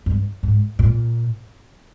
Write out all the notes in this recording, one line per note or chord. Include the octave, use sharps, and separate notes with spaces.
G2
G#2
A#2